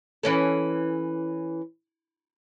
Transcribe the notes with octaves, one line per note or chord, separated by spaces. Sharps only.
E3 C#4 A4